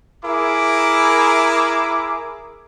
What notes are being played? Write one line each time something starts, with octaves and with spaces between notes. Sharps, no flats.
E4 G#4 A#4 D6